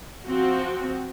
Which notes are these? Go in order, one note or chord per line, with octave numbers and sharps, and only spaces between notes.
F3 C4 F#4